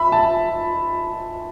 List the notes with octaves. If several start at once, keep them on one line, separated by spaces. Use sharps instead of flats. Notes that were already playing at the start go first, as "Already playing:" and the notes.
Already playing: E5 B5
A5